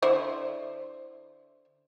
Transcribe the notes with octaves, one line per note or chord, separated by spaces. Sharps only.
D3 E4 C5